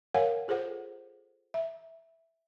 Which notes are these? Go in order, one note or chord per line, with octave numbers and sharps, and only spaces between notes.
A#4 C#5 F5 F#5 G#5
F4 G#4 A4 C5 F#5
E5